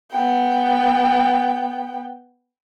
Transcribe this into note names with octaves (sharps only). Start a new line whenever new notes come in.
B3 G5